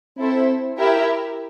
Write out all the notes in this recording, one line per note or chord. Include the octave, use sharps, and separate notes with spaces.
C4 E4 A4 C5 E5
E4 G4 A#4 E5